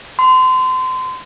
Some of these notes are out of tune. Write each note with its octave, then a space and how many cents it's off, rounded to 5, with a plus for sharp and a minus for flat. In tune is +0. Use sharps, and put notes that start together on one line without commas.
C6 -30